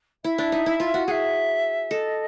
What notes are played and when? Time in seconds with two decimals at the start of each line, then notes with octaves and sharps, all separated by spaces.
0.24 E4 E5
0.38 D4
0.52 D#4
0.66 E4
0.80 F4
0.94 F#4
1.07 G#4 E5 F#5
1.91 A4 D#5